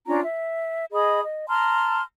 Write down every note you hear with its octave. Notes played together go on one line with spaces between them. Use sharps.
C#4 D4 F4 A#5
E5
G#4 D#5 B5 D#6
D#5
A5 A#5 C6 F6